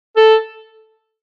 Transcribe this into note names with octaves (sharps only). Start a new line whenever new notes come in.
A4